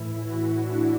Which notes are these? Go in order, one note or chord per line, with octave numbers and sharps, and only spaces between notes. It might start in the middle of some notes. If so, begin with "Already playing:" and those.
Already playing: A2 E3 E4
F#4
D4